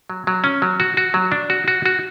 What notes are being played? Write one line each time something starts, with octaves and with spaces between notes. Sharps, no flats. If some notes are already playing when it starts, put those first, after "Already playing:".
F#3
F#3
C#4
F#3
F#4
F#4
F#3
D4
F#4
F#4
F#4